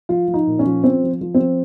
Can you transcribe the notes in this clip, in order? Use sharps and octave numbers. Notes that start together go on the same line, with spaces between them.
F3 F4
F3
D#4
A#2
C#4
F3
F3 C4
F3
F3
C4
F3